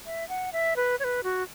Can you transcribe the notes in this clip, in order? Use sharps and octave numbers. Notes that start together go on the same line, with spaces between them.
E5
F#5
E5
B4
C#5
B4
F#4